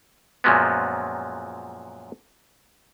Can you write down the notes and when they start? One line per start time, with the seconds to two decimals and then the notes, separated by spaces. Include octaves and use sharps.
0.44 F#2 A#2 F3 F#3 G#3 B3